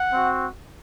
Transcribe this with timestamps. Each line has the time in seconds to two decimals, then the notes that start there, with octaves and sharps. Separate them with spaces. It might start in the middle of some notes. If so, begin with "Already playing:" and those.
Already playing: F#5
0.12 C4 F#4